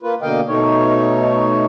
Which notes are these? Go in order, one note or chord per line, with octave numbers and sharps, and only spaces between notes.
A#3 F4 B4
B2 D3 A#3 D#5 F5 G5
B2 A3 D#4 C#5